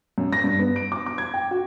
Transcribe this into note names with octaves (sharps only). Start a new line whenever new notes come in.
F#2
A#6
G2
B3
D7
D6
D6
G#6
G5
F#4